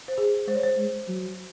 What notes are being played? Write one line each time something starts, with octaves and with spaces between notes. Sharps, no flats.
C5
G#4
G#3 C5
C#5
C5
G#3
F#3